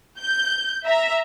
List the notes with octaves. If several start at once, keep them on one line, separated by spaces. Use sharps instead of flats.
G6
E5 A#5